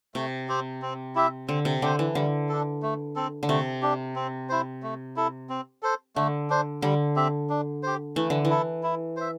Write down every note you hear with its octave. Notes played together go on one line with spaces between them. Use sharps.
C3 A3
C4 G4 C5
C4
E4 G4 E5
D3 C4
C3
D3 G4 C5
E3
D3 G3
D4 A4
A3
C4 A4
D3
C3 A3
D4 G4
C4
E4 C5
A3
E4 A4
C4
A4 C5
D3 A3
D4 C5
D3 G3
C4 G4 E5
D4
G4 C5
E3 A3
D3
E3
E4 A4
E4
C5 E5